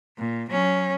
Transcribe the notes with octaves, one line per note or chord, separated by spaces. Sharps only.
A#2
F#3 C#4